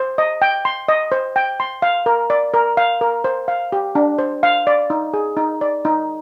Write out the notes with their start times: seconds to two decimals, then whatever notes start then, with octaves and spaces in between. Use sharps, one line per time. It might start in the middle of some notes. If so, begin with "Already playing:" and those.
Already playing: C5
0.18 D#5
0.42 G5
0.65 C6
0.88 D#5
1.12 C5
1.36 G5
1.60 C6
1.82 F5
2.06 A#4
2.30 D5
2.54 A#4
2.77 F5
3.01 A#4
3.24 C5
3.48 F5
3.72 G4
3.95 D4
4.18 C5
4.43 F5
4.67 D5
4.90 D#4
5.14 G#4
5.37 D#4
5.61 D5
5.85 D#4